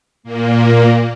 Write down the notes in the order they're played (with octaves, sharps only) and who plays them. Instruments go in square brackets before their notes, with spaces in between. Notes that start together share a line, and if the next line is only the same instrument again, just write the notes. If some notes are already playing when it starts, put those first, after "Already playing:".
[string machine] A#2 A#3